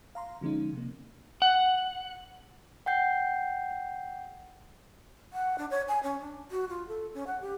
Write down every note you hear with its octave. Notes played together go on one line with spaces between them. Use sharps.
F5 A#5 C6
D3 F3 G#3 C#4 D#4
C3 A#3
F#5
F#5 G5 G6 C7
F#5
D4
C#5
G#5
C#4
D4
F#4
F4
A4
C#4
F#5
G4